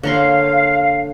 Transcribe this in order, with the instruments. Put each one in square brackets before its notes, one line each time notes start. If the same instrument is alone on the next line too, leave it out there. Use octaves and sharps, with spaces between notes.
[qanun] D3 A#5 C6 [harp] A#3 C#5 [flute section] F5